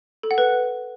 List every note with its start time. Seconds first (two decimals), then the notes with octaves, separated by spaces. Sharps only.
0.23 A4
0.31 F#5
0.38 B4